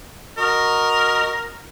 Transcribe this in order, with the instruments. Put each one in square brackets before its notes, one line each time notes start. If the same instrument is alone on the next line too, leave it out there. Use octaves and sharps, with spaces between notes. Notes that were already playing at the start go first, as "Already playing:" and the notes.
[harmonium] F#4 D#5 [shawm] A#4